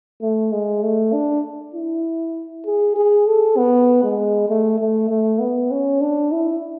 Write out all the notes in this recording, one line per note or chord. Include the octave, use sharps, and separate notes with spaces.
A3
G#3
A3
D4
E4
G#4
G#4
A4
B3
G#3
A3
A3
A3
B3
C#4
D4
E4